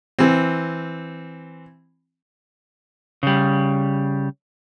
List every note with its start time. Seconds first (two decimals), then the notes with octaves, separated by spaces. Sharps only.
0.19 E3 C4
3.23 C#3 G3